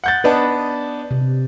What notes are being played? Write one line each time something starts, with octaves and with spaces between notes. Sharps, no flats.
F#5 G6 A6
B3 D4 B4 D#5 A5
C3